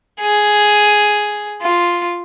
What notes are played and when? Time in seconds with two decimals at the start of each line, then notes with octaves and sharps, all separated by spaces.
0.21 G#4
1.62 F4